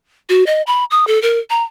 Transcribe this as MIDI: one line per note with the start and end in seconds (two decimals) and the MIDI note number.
0.29 0.46 66
0.46 0.62 75
0.67 0.85 83
0.91 1.07 87
1.07 1.21 69
1.22 1.39 70
1.50 1.63 82